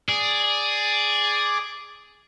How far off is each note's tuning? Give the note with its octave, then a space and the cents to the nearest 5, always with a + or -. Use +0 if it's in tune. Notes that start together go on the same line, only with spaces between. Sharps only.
G#4 +0 D5 +0